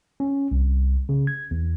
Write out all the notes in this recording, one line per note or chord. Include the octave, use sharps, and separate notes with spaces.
C#4
C2
C#3
G#6
E2